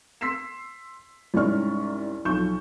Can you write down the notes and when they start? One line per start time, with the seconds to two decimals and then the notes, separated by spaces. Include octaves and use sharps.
0.21 C6 E6 B6 C7 E7
1.34 C2 G#2 C#4 D5 C#6 F6
2.25 B1 F3 C#6 G6 E7